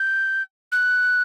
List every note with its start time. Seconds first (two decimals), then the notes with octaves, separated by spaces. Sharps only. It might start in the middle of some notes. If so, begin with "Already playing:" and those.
Already playing: G6
0.72 F#6